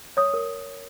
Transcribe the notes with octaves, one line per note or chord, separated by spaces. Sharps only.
C#5 D#6
A#4